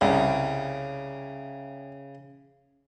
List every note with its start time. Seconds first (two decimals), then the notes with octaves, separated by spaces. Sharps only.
0.01 C2 C#3